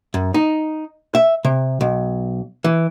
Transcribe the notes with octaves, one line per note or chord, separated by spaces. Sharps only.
F#2
D#4
E5
C3
B1
E3